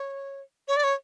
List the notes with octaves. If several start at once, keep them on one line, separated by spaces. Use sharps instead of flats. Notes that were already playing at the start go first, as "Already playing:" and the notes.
Already playing: C#5
C#5
D5
C#5